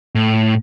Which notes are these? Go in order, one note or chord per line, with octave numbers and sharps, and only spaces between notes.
A2